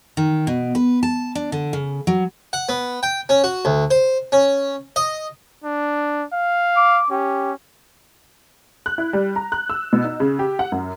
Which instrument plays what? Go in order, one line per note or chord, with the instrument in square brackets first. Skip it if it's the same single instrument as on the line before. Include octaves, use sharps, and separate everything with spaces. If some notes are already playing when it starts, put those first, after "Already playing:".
[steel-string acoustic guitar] D#3
B2
B4
A5
D4
D3
C#3
F#3
[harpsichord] F#5
B3
G5
C#4
F#4
D2
C5
C#4
D#5
[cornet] D4
F5
[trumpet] D6
[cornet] C#4 [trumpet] G4
[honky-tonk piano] F#6
E4
G3
A#5
F#6
E6
B2
D#4
C#3
G4
F#5
F#2